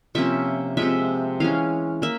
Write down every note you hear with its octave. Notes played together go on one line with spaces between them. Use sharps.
C3 F3 A#3 C#4 E5
C3 F3 G#3 E5
E3 G#3 C#4 F5
A#3 E5